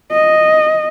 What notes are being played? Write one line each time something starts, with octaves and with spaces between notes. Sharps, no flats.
D#5